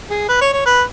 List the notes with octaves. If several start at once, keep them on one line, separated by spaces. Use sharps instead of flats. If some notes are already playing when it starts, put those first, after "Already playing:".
G#4
B4
C#5
C#5
B4